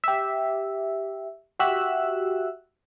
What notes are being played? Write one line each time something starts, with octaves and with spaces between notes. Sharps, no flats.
G4 E5
F#4 G4 E5 E6 F#6